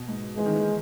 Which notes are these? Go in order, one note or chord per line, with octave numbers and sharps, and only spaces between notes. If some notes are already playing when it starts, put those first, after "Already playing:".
Already playing: B2
G#2
E3 G#3
D#3
E3